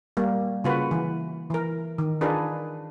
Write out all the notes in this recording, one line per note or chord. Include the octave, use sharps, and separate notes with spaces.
G3 A#3
C#3 A#3 F4 F#4 B4
E3
E3 A#4
D#3
D4 D#4 F4 G#4 A#4 B4